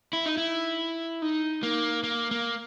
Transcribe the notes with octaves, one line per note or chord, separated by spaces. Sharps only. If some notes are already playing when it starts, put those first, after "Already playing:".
E4
D#4
E4
D#4
A#3
A#3
A#3